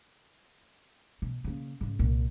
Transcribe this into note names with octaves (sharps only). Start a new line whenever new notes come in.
B2
C#3 A#3
G#2 C#3
C2 A#2